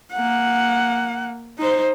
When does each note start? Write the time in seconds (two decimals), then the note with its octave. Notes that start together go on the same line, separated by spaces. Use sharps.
0.13 A#3 F#5
1.59 D#4 C5